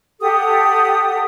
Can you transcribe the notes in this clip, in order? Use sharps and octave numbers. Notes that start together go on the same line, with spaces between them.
G4 A4 F#5 D#6